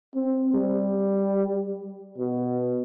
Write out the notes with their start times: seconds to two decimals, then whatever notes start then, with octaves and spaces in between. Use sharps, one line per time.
0.15 C4
0.54 G3
2.18 B2